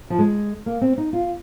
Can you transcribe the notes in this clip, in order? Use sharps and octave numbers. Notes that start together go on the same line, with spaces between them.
F3
G#3
A#3
C4
D#4
F4